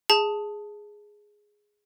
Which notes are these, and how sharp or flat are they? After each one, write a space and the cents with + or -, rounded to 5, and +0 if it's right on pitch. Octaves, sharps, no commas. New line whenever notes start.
G#4 +0 A5 +0